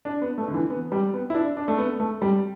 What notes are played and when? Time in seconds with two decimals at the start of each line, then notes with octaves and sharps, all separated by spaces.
0.05 D4
0.22 B3
0.38 A3
0.48 D3
0.54 E3
0.70 B3
0.92 G3
1.14 B3
1.30 E4
1.35 D4
1.57 D4
1.68 A3
1.78 B3
2.00 A3
2.22 G3